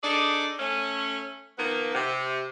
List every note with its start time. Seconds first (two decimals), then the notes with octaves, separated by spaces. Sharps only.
0.02 D4 D#4 G#4 A4 D5
0.59 A3 C#4
1.58 D#3 F3 A#3 B3
1.95 C3